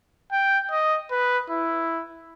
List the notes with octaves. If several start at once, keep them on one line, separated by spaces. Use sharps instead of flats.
G5
D#5
B4
E4